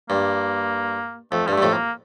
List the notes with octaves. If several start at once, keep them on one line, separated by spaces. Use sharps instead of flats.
G2 A#3
F2 A3
G2 G3
A3
G2
F2 A2
A#3